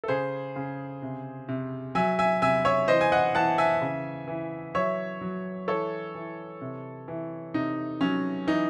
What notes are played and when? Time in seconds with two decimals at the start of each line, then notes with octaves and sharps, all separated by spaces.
0.04 A4
0.08 C#3 G#4 C5
0.56 C#3
1.02 C3
1.48 C3
1.95 F#3 E5 G#5
2.19 E5 G#5
2.42 C3 E5 G#5
2.65 C#5 E5
2.88 E3 C5 D#5
3.01 G#5
3.12 D#5 F#5
3.35 E3 F#5 A5
3.58 E5 G#5
3.82 C#3
4.28 E3
4.75 F#3 C#5 E5
5.21 F#3
5.68 E3 A4 C#5
6.15 E3
6.61 C3
7.08 E3
7.54 C3 D#4
8.01 F#3 C#4
8.47 E3 D#4